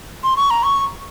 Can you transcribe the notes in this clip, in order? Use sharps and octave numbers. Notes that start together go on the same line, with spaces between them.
C6
C#6
A#5
C#6